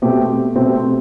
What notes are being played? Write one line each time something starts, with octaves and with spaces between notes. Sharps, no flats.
B2 A3 C4 G4
B2 A3 C4 G4